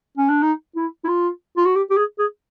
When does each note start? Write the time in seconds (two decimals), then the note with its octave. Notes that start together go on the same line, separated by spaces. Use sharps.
0.17 C#4
0.29 D4
0.42 D#4
0.76 E4
1.04 E4
1.08 F4
1.57 F4
1.65 F#4
1.76 G4
1.90 G4
1.97 G#4
2.19 G#4